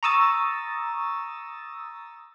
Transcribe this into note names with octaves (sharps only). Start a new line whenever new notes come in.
A#5 C#6 D#6 E6 A6